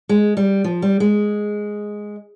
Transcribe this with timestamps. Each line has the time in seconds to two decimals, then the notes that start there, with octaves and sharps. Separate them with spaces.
0.09 G#3
0.37 G3
0.64 F3
0.82 G3
1.00 G#3